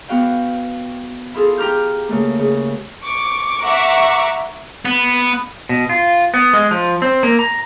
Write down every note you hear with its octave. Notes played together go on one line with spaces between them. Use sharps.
B3 F#4 F5 G5
E4 F4 G#4 A4
G4 A#5 D6 F6 G6
C#3 A3 A#3
C#3
C#6 D6
E5 F#5 A#5 C#6 D6
B3
B2
F4
B3
G#3
F3
C4
A#3
A#5